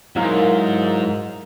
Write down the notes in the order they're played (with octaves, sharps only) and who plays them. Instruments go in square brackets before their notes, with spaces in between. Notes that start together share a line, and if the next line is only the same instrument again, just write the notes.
[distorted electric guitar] G#2 [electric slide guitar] F#3 E4 F5 [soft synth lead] A#4